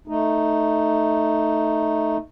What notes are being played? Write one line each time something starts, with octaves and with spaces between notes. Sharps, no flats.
A3 D#4